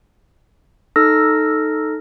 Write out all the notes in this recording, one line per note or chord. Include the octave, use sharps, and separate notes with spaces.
D#4 A4 E6 F6 A#6